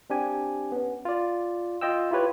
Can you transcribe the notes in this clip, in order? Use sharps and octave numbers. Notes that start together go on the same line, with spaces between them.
C4 D4 G4 G#5
B3 C#4
F4 D5
F4 D#5 G5 E6
E4 F4 G4 B4 C#5